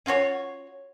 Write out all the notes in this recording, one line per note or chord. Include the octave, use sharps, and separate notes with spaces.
C#4 F4 F#4 C#5